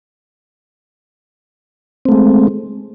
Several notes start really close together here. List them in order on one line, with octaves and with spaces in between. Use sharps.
C4 A3 G#3